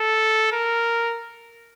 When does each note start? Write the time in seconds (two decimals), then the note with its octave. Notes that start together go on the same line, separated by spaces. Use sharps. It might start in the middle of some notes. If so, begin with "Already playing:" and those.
Already playing: A4
0.52 A#4